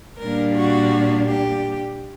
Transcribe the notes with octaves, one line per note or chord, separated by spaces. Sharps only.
A#2 G3 A#3 D4 A#4
F#4
G4